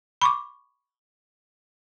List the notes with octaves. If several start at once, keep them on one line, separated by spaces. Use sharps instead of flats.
B5 C#6 D6